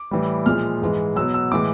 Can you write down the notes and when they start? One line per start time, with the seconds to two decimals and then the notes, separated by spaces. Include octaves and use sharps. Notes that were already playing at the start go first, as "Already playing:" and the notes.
Already playing: D6
0.11 A2 E3 G3
0.46 A#2 F3 G#3 F6
0.82 G#2 E3 G#3
1.16 B2 F#3 E6
1.34 E6
1.52 A2 E3 G#3 D6